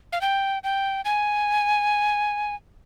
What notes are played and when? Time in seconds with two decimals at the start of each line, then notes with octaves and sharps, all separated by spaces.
0.12 F5
0.21 G5
0.64 G5
1.05 G#5